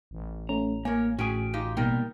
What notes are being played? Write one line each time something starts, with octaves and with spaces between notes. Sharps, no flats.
A1
A3 C#4 A#5
A#3 A#4 C#5 G#5
A2 C#4 F#4 G#4 G5 G#5
D#4 F4 G4
B2 G3 A#3 D#4 A#4 G5